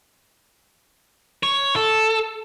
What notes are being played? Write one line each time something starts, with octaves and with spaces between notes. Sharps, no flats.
C#5
A4